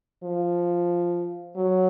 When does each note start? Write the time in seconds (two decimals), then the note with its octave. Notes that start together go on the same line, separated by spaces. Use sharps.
0.24 F3
1.56 F#3